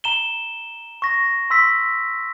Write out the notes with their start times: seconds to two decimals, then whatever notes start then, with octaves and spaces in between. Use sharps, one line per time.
0.04 A#5 E7 G7
1.02 C#6 A#6
1.50 C6 E6 B6